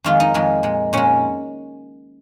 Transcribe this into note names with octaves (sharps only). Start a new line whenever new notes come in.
F2 D#3 G#3 F4
D#4
F2 D#3 G#3
A#2 G#3
A#2 G#3 C#4